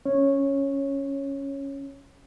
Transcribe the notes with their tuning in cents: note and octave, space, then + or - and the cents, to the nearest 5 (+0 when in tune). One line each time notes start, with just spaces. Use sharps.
C#4 +0 C#5 -10